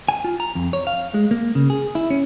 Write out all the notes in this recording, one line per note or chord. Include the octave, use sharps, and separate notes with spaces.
G#5
F4
A#5
F2
C#5
F5
G#3
A#3
C#3
G#4
E4
C#4